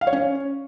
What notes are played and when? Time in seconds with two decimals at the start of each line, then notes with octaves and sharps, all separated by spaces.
0.01 F5
0.07 C#5
0.13 C#4